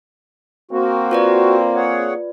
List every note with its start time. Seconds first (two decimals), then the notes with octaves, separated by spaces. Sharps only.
0.71 A#3 C4 F#4
1.11 F4 B4 D5
1.76 G#4 C#5 F#5